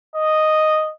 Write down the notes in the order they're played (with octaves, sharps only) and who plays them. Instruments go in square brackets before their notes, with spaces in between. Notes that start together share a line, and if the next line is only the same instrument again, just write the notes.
[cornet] D#5